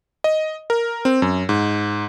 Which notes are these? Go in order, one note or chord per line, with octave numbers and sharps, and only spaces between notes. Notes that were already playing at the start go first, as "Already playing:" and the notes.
D#5
A#4
C4
F#2
G#2